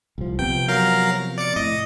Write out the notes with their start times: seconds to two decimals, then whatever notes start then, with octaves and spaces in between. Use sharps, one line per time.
0.18 C2 F3
0.39 C3 F3 B3 G5
0.68 F#3 A#4 F5
1.38 D5 D6 C#7
1.56 A2 D#5